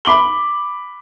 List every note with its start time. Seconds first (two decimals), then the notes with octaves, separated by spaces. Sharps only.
0.05 B5 D6 F#7 G7